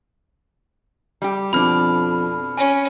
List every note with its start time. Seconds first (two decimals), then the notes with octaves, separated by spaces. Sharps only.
1.22 G3 G4
1.53 F2 B2 D4 B5 F6
2.57 C#4 G#5